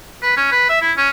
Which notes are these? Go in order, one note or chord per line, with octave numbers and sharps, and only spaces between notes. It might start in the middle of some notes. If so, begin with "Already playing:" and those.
B4
C#4
B4
E5
E4
C#4